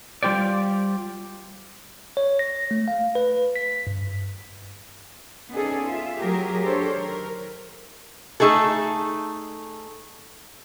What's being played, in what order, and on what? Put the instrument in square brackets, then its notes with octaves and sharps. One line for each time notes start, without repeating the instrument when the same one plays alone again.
[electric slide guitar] G3 F4 G4 C5 D5
[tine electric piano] C#5
A#6
A3
F5
B4
B6
G2
[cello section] B3 C#4 D#4 G#4 A4 D5
F4 E5
F#3 A3 G4 G#4 A#4
D4 G4 A4 A#4 C5 C#5
D#3 A#4
[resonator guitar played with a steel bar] A3 D#4 G#4 A4